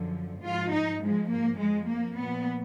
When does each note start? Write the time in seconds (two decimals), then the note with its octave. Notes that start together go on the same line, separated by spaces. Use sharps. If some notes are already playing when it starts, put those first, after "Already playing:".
Already playing: F#2 D3 F3
0.41 G#2 F3 F4
0.72 D#4
1.00 G#2 F3 G#3
1.29 A#3
1.59 F2 F3 G#3
1.88 A#3
2.17 A#2 F3 B3